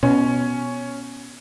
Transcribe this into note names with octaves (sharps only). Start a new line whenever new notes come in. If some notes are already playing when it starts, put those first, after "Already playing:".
B2 C#4